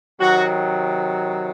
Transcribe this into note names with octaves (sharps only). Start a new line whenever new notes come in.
C3 D#3 F#3 F#4